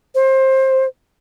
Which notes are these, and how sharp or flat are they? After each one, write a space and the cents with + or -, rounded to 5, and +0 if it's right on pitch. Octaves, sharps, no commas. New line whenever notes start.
C5 +20